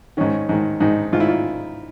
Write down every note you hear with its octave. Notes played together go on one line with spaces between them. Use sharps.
G#2 D#3 C#4
G#2 D#3
G#2 D#3 D#4
G#2 D#3 F4
E4
F4